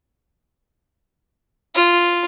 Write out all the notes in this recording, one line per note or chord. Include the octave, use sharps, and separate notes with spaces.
F4